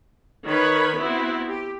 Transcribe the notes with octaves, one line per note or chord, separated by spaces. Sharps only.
D#3 B4 C#5 B5
B3 C4 E4 F#4
G4